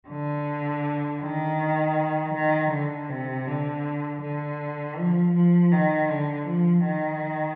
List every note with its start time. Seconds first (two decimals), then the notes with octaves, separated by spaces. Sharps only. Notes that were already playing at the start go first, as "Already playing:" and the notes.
0.08 D3
1.21 D#3
2.34 D#3
2.71 D3
3.09 C3
3.47 D3
4.22 D3
4.97 F3
5.35 F3
5.72 D#3
6.10 D3
6.47 F3
6.85 D#3